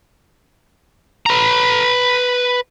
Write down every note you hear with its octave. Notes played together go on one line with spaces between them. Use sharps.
B4 A#5